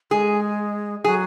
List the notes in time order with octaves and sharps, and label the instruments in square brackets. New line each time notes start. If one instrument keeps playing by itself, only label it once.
[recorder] G#3 [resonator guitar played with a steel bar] G#4
[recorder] F#3 [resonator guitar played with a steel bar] G#4